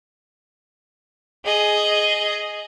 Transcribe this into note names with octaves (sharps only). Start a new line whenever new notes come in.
G#4 D#5